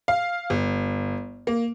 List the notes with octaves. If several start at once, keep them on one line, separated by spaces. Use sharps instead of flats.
F5
G1
A#3